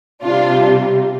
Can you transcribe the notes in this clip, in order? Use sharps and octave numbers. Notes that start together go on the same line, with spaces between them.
C3 G3 D4 F4